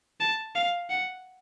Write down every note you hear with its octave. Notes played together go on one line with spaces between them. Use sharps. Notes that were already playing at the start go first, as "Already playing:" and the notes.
A5
F5
F#5